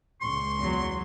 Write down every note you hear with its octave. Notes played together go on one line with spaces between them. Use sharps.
C#2 A#2 C6 C#6
E2 F#3